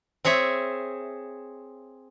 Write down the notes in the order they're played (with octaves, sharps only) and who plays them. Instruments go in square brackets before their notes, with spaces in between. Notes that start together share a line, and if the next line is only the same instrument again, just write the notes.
[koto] C4 G#4 C#5 E5